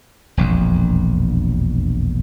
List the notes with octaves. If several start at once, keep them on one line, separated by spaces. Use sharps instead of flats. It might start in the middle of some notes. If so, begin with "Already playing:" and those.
E1 A#1 F2